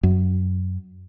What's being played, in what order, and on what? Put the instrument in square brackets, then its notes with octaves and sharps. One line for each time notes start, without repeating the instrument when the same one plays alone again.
[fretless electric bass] F#2